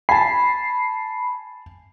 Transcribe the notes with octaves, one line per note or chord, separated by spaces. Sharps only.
G#5 A5 B5 C7